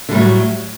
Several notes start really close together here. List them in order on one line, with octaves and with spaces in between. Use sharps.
D3 G3 A2 F#3